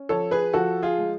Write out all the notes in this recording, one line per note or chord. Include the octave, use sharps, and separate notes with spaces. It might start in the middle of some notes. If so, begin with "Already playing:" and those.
Already playing: C#4
F3 A4 C#5
G#4 B4
F3 F#4 A4
F4 G#4
G#3